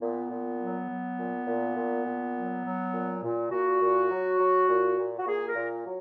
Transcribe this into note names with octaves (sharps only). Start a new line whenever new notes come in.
A#2 B3
A#2
F#3
F#3
A#2
A#2
A#2
A#2
F#3
F#3
A#2
A#2
A#2 F#4
A#2
F#3
F#3
A#2
A#2
F#4
A#2 G#4
A#4
A#2
F#3